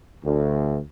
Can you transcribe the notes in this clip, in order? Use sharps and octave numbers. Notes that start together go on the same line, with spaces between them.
D2